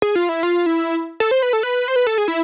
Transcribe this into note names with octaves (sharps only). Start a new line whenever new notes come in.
G#4
F4
E4
F4
E4
A4
C5
B4
A4
B4
C5
B4
A4
G#4
E4